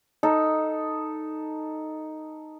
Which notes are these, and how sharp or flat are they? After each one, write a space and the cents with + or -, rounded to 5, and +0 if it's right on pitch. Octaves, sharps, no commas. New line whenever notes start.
D#4 +0 A4 +0